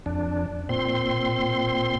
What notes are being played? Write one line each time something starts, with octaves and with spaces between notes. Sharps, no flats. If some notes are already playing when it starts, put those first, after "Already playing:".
F2 D4
A#2 C4 C6